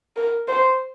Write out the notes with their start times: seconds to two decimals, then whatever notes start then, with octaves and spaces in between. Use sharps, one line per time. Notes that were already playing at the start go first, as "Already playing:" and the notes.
0.17 A#4
0.48 C5